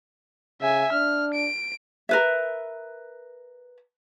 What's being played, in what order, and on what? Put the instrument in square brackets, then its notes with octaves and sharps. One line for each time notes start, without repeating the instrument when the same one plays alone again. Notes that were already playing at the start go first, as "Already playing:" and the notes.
[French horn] C#3 [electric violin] E5 G#5
[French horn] D4 [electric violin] F6
[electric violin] D7
[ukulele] A#4 B4 E5